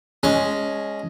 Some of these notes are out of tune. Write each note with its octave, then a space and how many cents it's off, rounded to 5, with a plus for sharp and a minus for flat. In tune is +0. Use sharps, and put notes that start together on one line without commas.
G#3 +0 C#4 +0 A5 -35